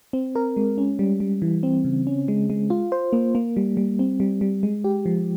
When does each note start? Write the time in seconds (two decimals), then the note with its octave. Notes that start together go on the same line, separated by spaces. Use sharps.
0.13 C4
0.35 A#4
0.57 G#3
0.78 C#4
0.99 G3
1.20 G3
1.42 E3
1.63 C4
1.85 C#3
2.07 C#4
2.28 G#3
2.50 G#3
2.70 F4
2.92 C5
3.13 A#3
3.35 A#3
3.57 G3
3.77 G3
3.99 C4
4.20 G3
4.41 G3
4.63 G#3
4.84 G4
5.06 F3